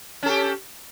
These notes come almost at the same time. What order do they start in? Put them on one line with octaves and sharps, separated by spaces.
C#4 A4 G4